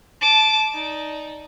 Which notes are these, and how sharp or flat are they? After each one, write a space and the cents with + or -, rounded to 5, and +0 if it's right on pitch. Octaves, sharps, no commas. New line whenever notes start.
A5 -20 D6 +0
D#4 +0 D5 -5